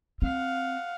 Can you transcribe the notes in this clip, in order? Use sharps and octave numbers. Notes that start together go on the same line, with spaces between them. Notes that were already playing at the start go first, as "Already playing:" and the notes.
C4 F5 F#5